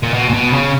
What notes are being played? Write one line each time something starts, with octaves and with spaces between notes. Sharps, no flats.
A#2
B2
A#2
B2
C#3